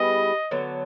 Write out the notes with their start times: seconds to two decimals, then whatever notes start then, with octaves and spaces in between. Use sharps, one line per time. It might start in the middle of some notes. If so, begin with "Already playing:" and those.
Already playing: G3 B3 E4 G#4 D#5
0.51 D3 F#3 B3